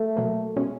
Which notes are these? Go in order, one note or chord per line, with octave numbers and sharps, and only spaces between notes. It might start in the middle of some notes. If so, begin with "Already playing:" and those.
Already playing: A3
B2 F#3 A#3
B2 G#3 C#4